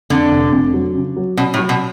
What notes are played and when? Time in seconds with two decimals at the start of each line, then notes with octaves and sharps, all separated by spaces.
0.10 F2 D3
0.31 F1
0.52 F2
0.74 F#3
0.95 C#3
1.16 F#3
1.37 B2 C#4
1.54 A2
1.59 F#3
1.69 B2